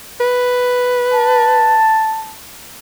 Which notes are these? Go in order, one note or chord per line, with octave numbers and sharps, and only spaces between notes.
B4
A5